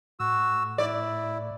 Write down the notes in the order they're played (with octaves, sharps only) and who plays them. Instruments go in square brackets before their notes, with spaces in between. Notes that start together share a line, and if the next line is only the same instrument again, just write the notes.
[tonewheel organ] A2 [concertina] F#4 E6
[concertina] E4 [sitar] D5